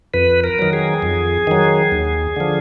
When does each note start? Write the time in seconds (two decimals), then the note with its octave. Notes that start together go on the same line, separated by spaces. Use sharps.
0.14 F2 B4
0.44 A#4
0.59 D#3 F#3
0.73 G#4
1.02 F2
1.47 D#3 F#3
1.92 D#2
2.36 D3 F3